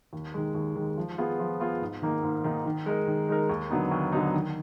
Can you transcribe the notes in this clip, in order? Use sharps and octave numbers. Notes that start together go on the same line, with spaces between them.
D#2
D#3 G#3
D#2
D#3 G#3
F3
B3 F4 G#4
F3
B3 F4 G#4
G#2
D#3 A#3 D#4
G#2
D#3 A#3 D#4
D#3
G#3 D#4 A#4
D#3
G#3 D#4 A#4
D#2
D3 F#3 B3 D#4
D#2
D3 F#3 B3 D#4
D#3